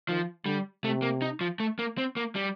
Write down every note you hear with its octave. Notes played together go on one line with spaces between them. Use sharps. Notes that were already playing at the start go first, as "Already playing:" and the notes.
D#3 F3
D3 G3
C3 A3
A#3
D#4
F3
A3
A#3
C4
A#3
G3